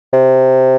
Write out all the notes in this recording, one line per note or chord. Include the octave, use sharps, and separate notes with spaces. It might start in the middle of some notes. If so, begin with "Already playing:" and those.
C3